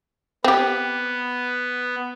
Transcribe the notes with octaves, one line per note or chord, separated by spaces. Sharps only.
B3 C4 G4